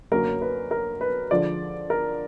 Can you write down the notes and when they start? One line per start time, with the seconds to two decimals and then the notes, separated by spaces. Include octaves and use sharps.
0.12 F#2 D3 F#3 A#3 A#4
0.42 B4
0.71 A#4
1.01 B4
1.30 D3 F3 G#3 D5
1.90 A#4